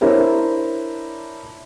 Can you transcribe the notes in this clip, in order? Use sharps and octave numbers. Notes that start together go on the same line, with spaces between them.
D4 E4 A#4 C5 C#5